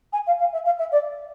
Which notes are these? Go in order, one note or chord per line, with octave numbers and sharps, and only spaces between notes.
G#5
F5
F5
E5
F5
E5
D5